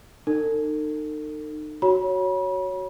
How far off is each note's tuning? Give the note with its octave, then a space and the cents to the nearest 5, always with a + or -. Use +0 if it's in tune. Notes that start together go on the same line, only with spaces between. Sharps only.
D#4 -30 A4 +45
F#4 +5 C#5 +0 B5 -40